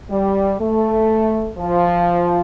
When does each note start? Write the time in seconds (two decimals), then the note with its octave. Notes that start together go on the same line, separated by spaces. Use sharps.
0.09 G3
0.60 A3
1.58 F3